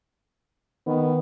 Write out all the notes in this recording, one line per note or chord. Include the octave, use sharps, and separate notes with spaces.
D#3 B3